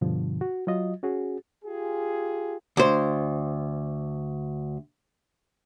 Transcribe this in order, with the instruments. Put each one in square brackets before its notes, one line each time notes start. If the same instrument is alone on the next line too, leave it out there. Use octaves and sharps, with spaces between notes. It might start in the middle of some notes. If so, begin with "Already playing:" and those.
[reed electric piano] G2 B2 D3 F3
F#4
F#3 F4 D#5
C#4 F#4 G#4
[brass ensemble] F4 G4 G#4
[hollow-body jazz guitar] D2 C5